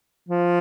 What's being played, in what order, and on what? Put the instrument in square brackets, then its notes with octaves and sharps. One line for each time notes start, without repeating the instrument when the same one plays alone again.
[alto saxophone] F3